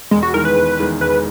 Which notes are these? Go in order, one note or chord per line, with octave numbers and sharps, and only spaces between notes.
E1 G#3
F#4
E2 D#3 G#3 A#4
B4
E1
E2 D#3 G#3
E1 B4